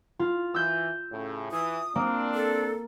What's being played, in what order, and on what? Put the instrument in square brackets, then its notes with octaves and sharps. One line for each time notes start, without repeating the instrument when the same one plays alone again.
[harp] F4
[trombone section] E3 [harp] E6 G6
[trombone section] A2 C#3
[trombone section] E3 [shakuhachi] D#6
[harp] A#3 [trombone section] C4 D4
[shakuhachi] A4